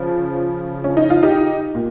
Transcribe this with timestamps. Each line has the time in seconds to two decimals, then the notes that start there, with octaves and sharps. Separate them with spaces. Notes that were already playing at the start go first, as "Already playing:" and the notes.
Already playing: C#3 F3
0.84 C#4
0.97 D#4
1.10 F4
1.23 D#4 G4
1.75 A#2